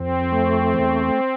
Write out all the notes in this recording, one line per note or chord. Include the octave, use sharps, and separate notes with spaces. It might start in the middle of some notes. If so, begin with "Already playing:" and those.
Already playing: F2 C4
A3
E2